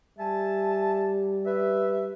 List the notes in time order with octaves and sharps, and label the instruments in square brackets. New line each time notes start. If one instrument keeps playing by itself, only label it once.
[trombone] G3 [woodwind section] E5 G#5 A5
[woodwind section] B4 E5